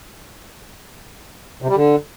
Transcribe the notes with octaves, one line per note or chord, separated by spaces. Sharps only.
C3
G3
D3